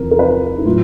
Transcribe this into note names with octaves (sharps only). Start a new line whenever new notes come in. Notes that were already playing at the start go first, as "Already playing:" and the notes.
Already playing: E2 C3 F3 A#4
A#4
B4
E4
A2 F#3 F4